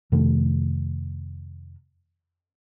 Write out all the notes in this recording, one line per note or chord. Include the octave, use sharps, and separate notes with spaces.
F2 C3 D#3 A3